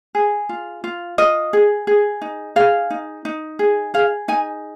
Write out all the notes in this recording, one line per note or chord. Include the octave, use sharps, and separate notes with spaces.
G#4
F4
F4
F4 D#5
G#4
G#4
D#4
G#4 F5
D#4
D#4
G#4
G#4 F5
D#4 G#5